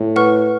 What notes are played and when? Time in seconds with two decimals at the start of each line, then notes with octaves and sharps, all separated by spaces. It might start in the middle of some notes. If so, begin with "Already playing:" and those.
Already playing: A2
0.16 B4 F#5 C#6 F6